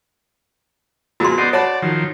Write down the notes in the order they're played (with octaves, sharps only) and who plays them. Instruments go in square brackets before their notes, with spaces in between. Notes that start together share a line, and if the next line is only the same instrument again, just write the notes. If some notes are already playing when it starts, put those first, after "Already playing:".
[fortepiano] F2 A#2 G#3 [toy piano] F#4 C6
[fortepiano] B3 [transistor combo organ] C5 D5 D#5
[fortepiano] F#4 A5 B5 [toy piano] C#5 [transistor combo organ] D5
[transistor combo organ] D#3 F3 [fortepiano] F#3